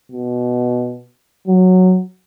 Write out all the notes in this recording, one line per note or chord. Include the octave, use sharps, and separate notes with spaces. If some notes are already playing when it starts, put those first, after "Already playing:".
B2
F#3